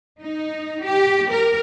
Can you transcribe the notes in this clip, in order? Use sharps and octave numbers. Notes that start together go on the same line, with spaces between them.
D#4
G4
A#4